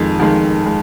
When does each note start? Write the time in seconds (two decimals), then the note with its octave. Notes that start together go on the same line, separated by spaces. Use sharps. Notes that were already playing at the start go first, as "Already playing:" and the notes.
Already playing: F2 D#3 G#3
0.19 F2 D#3 G#3
0.66 G#3